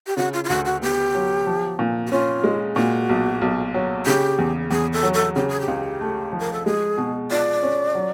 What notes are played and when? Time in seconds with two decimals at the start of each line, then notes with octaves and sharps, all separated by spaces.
0.07 G4
0.17 C#3 F#4
0.33 F4
0.44 F4
0.49 D2 F#4
0.65 F#4
0.82 B3 G4
1.14 F#3
1.47 F3
1.79 A#2
2.07 F#4
2.11 C#4 F4
2.44 G#3
2.76 A#2 F#4
3.09 B1
3.41 B1
3.74 F#3
4.06 C#3 G4
4.39 E2
4.71 E2 G#4
4.93 A4
5.03 F#3
5.14 A4
5.36 C#3 G4
5.49 G#4
5.61 G4
5.68 C#2
6.01 A3
6.33 F3
6.39 A#4
6.53 A4
6.66 G#3 G#4
6.98 B2
7.31 F4 D5
7.63 C#4
7.95 F#3